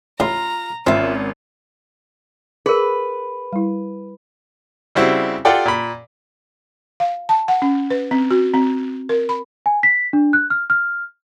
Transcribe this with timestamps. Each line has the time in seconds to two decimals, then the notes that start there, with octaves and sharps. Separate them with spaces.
0.20 A1 A2 F4 A#5
0.87 G#1 C4 C#4 F4 E5
2.66 G#4 A#4 B4
3.53 G3 E4
4.95 C#3 G3 C4 E4 F#4
5.45 F4 G4 A4 D5 F#5 G5
5.66 A#2 B5
7.00 F5
7.29 A5
7.48 F#5
7.62 C#4
7.90 B4
8.11 C4
8.31 F#4
8.54 C4
9.09 A#4
9.29 B5
9.66 G#5
9.83 B6
10.13 D4
10.33 F#6
10.50 F6
10.70 F6